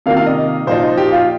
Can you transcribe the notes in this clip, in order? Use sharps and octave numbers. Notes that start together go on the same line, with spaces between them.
C3 D#3 A#3 F4 F5
F5
D#5
A#2 F3 D#4 C5
G4
F4